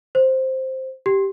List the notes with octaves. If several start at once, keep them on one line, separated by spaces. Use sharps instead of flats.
C5
G4